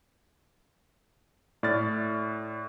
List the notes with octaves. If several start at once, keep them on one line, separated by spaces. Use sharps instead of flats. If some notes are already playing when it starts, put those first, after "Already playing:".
A2 D5 F6 A6